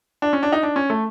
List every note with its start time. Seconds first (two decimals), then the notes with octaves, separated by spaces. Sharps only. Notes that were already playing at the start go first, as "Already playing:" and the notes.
0.22 D4
0.33 C#4
0.43 D4
0.52 D#4
0.63 D4
0.76 C#4
0.90 A3